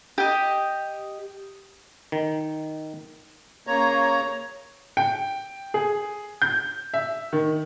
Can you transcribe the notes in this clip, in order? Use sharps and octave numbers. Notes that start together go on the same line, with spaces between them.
G4 D#5
D#3
C#3 A#3 C#5 A#5
G5
G#4
G6
E5
D#3